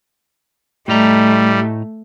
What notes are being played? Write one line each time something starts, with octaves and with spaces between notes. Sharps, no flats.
A2 G3 A3 D#5 A#5